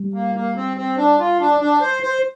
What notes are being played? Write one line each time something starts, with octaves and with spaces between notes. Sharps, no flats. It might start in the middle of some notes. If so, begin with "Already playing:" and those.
Already playing: G3
A#3
A#3
C4
C4
D4
F4
D4
D4
C5
C5